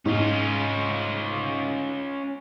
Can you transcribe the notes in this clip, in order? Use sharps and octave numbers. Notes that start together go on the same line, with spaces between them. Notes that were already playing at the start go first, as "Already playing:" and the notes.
G#2 C#4 F4